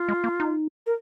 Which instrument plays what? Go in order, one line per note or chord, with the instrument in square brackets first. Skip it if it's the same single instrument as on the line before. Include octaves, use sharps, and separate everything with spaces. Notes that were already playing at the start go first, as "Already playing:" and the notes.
Already playing: [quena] F4
[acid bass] G#3
A#3
D#4
[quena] A#4